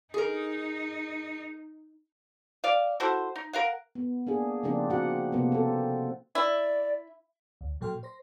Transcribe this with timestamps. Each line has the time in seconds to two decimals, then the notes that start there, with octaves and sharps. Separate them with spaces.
0.14 D#4 G#4 A#4
2.64 D5 F5
3.00 E4 F#4 A4 C5
3.36 D#4
3.53 A#4 F5 F#5
3.95 B3
4.27 A#3 D4 G#4
4.63 C#3 F3 A#3 C4 D4 D#4
4.90 A#2 C4 F#4 F#5
5.32 C3 A#3 B3
5.52 C4 A4
6.35 E4 D5
7.61 D2
7.81 A#2 F#3 A4 G5 C6 F6
8.03 C5 C6 A#6